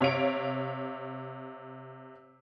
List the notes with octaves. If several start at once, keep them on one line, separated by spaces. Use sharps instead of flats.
C3 C#5 F5 D7